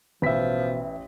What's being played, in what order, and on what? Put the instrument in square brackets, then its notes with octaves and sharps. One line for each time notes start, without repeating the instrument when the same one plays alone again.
[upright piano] A1 B6 [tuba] B2 [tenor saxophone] F3 [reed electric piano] B4 E5